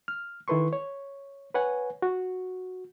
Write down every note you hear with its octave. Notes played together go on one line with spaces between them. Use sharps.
F6
D#3 E4 A4 B4 C6 C#6
C#5
B4 C#5 F#5 G#5
F#4